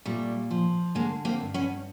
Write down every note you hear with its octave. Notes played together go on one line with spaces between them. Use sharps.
A#2 G3 A3
F3
D3 G#3 A#3
A#3 C4
G2
B3 C#4